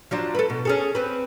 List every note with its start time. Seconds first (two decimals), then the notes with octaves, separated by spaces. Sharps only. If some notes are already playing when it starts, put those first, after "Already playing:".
0.11 F3 F#3 D4
0.35 A4 B4
0.50 B2
0.65 C#4 G#4 A4
0.95 C4 B4